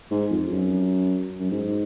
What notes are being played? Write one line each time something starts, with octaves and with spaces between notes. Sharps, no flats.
G#2
F2
F#2
F#2
G#2